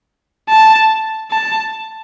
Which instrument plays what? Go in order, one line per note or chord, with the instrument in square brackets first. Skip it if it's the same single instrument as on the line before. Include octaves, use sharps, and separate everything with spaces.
[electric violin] A5
A5